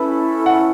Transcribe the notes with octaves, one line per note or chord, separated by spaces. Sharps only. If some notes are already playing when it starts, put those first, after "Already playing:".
Already playing: C#4 E4 A4 B4
F#5